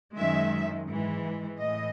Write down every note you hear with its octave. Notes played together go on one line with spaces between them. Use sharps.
F#2 D#3 G#3 E5
G#2 E3 G#3
A2 E3 D#5